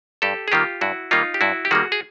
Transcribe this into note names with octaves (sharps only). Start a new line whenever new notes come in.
G2 G4 A4
G#4
D#3 G3 A#3 F4 G4
G2 E4 F#4
D#3 G3 A#3 D#4 F4
G4
G2 E4 F#4
G4
D#3 G3 A#3 F#4 G#4
G#4